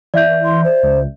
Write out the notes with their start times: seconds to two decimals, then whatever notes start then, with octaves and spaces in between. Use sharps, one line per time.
0.14 E3 D5 E5 G6
0.45 C6
0.64 C5
0.83 C#2